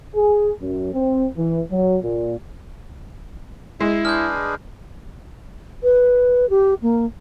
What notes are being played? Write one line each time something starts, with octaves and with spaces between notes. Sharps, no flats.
G#4
F#2
C4
E3
F#3
A#2
G#3 E4
D4 G#4 B4 F6 G6
B4
G4
A#3